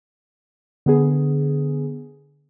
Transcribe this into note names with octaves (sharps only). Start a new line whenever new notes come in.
D3 B3 G#4